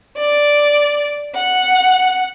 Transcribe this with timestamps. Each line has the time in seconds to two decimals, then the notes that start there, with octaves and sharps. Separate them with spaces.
0.17 D5
1.34 F#5